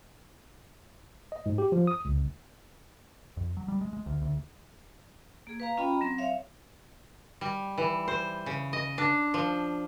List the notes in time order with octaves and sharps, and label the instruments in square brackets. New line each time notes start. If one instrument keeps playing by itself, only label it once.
[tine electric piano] D#5
G#2
G4
F3
D#6
C#2
[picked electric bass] F2
F#3
G3
G#3
G#3
D2
D2
[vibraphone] A#3 G#4
B4 F5 A#5
C#4 F4 D#5 G5 B5
A#5
F#3 C4 C6
C#5 E5 F5
[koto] G3
E3
C5
C#3
D#5
D4
F3